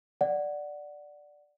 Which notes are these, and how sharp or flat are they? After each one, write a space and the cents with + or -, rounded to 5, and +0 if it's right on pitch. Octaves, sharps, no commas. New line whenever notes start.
D5 +0 F#5 +0